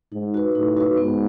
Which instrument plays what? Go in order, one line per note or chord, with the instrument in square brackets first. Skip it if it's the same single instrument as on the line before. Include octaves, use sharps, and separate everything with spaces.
[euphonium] G#2 [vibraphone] D#4
[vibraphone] F#4 B4
[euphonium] A2 [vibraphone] D#4
[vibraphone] F#4 B4
[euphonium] G#2 [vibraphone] B3